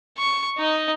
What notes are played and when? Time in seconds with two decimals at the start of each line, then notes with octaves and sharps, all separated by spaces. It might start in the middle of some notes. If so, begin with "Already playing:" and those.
0.17 C#6
0.57 D#4 D#5